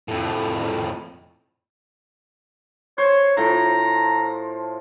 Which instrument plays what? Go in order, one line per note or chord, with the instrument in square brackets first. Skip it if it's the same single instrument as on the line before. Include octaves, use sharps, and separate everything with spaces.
[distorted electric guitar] F2 A2
[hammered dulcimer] C5 [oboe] C#5
[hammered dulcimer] A2 F3 [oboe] A#5